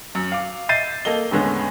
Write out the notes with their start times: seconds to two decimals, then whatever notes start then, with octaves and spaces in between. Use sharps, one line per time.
0.15 F#2
0.32 F5 D6
0.69 D#5 E5 G6 A6 C7 D#7
1.05 A#3 A4 D#5 G7
1.31 E2 A2 D3 G#3 B3 C#4